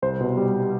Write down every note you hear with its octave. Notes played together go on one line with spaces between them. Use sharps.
C2 C5
B2
G3